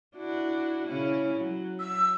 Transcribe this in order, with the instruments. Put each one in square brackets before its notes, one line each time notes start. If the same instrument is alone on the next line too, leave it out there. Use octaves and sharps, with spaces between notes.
[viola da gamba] D4 E4 F#4
C#3 C#4 E4
F#3
[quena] E6